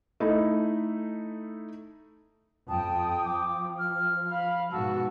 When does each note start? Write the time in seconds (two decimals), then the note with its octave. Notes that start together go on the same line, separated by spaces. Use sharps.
0.20 A3 D#4 E4
2.68 F2 G5 A5 D#6
3.25 F3 D6
3.79 F6
4.32 F5 B5
4.72 G#2 B2 F#4 A5 E6